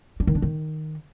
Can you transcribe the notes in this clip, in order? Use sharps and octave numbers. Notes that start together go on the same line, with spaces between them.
D4
D#3
D4
D#3